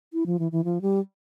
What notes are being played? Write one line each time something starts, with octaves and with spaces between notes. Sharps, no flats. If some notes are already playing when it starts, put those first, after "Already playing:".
E4
F3
E3
E3
F3
G3